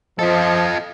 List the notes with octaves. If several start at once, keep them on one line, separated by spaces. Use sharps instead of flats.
F3 F4 A4 D#5